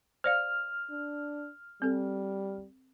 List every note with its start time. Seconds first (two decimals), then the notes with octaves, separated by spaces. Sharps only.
0.24 C5 D5 F5 F6
0.90 D4
1.82 G3 C4 A4